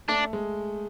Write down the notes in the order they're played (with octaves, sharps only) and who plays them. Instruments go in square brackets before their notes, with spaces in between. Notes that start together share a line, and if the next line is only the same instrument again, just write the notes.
[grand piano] A3 [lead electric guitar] D4
[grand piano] G#3